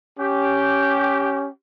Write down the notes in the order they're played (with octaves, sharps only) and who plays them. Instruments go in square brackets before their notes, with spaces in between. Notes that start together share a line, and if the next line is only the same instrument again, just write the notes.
[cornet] C#4 [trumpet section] G4